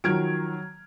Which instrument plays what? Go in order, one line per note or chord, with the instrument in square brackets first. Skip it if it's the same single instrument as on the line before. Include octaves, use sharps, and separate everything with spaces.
[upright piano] D#3 F3 F6 [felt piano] F#3 G#6 D7